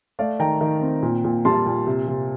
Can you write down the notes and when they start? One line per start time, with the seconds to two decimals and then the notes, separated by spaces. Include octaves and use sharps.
0.19 A3 D5 F5
0.39 D#3 G5 A#5
0.61 D#3
0.81 C4
1.03 A#2
1.24 A#2
1.45 G3 A5 C6
1.66 A#2
1.87 C3
2.07 C3